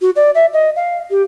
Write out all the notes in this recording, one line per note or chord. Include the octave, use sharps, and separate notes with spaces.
F#4
D5
E5
D#5
F5
G4